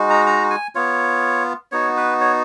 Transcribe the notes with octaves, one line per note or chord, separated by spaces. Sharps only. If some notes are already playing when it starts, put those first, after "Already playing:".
Already playing: G#3 D#4 F#4
A#5
A#5
G#5
B3 F4 C#5
B3 D#4 F#4 C#5
B4
C#5